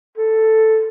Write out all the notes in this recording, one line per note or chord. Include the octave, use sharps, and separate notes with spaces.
A4